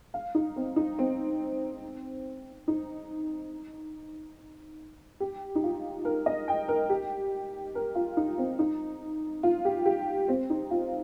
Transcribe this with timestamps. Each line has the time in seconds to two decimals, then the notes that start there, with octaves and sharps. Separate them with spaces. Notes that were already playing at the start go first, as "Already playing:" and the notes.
0.14 F5
0.35 D#4
0.56 C4
0.76 D#4
0.99 C4
2.68 D#4
5.20 G4
5.55 D#4
5.64 F4
6.05 A#4
6.26 D#5
6.48 G5
6.68 A#4
6.90 G4
7.75 A#4
7.95 F4
8.17 D#4
8.38 C4
8.59 D#4
9.43 F4
9.65 G4
9.86 G4
10.28 C4
10.50 D#4
10.71 F4